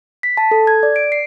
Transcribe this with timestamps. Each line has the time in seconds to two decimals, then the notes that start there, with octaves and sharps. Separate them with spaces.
0.23 B6
0.37 A5
0.51 A4
0.67 G#6
0.83 D5
0.96 D7
1.12 C7